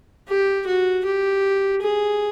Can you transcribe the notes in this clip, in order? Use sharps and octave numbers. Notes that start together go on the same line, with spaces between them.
G4
F#4
G4
G#4